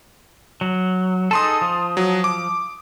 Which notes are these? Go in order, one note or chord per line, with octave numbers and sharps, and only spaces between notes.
F#3
D#4 G#4 A4 A5 C6 D#6
F3
F#3
D6